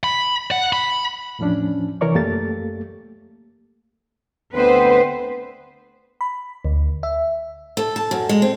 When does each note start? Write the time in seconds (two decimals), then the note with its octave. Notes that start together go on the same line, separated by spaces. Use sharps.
0.04 B5
0.51 F#5
0.73 B5
1.39 E2 A2 F3 C#4 D4
2.01 C3 E3 A#4 C#5 D5 C#6
2.14 F#2 A3 A#3 G4 A4 A6
4.55 D2 B3 C4 B4 C5
6.21 B5
6.65 D2
7.03 E5
7.77 A4
7.96 A5
8.11 F#2
8.29 G#3
8.42 C4